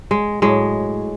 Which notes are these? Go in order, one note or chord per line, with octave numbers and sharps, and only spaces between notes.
G#3
A2 F#3 G#3